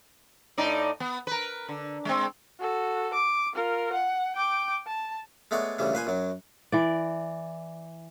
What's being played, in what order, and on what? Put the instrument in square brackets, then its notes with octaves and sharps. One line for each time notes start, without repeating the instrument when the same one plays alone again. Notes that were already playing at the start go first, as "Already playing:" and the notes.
[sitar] A2 D#4 D5
B3
A#4 B4
D3
G#3 C4
[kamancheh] F#4 A4
D6
F4 A#4
F#5
G5 D6
A5
[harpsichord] G#3 A3 B3 C#5 D5
D2 C#3 E3 G3
A#2 B4 C5 G#5
F#2 F#3
[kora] E3 D5